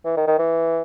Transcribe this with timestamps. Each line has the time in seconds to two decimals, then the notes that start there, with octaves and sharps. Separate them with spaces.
0.05 E3
0.17 D#3
0.27 D#3
0.39 E3